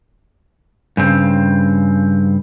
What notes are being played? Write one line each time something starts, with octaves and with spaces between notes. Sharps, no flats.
G2 C#3 C4